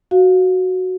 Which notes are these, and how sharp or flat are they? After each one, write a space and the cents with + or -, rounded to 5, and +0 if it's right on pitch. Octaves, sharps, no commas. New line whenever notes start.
F#4 +0 F5 +10